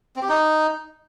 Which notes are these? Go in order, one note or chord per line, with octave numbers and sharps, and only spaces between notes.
C4
G4
D#4